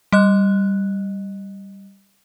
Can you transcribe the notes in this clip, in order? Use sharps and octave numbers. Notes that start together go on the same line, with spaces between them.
G3 D#5 F#6